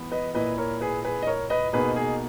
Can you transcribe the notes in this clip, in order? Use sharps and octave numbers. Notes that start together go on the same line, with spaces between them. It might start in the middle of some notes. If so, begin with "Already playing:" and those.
Already playing: E3 B3
B4 D#5
A#2 A#3 E4 B4 D#5
A#4 C#5
G#4 B4
G#4 B4
D#5
A#4 C#5
B4 D#5
B2 A#3 D#4 G#4 B4
G#4